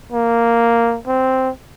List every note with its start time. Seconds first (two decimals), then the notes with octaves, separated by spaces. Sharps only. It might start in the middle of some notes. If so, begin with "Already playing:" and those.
0.12 A#3
1.07 C4